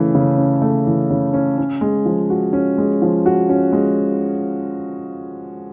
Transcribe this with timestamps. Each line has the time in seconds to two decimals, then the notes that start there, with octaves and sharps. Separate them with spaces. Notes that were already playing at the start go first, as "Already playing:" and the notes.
Already playing: C#3 E3 A3 C#4
0.15 C#3
0.38 C#4
0.62 A3
0.87 E3
1.10 C#3
1.33 C#4
1.58 C#4
1.81 G#3
2.05 F3
2.30 F#4
2.53 C#4
2.78 G#3
3.02 F3
3.26 F#4
3.49 C#4
3.73 G#3